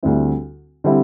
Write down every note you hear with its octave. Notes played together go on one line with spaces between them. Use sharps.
D2 D3 G3 C4 E4
D3 G3 C4 E4